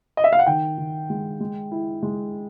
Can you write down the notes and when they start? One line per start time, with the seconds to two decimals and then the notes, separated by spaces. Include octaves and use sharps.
0.17 D#5
0.24 E5
0.33 F5
0.39 F#5
0.47 D#3 G5
0.78 D#3
1.10 G#3
1.40 G#3
1.72 E4
2.03 G#3